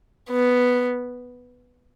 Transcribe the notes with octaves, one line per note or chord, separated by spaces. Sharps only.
B3